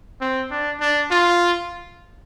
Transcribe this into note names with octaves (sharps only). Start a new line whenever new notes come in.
C4
D4
D4
F4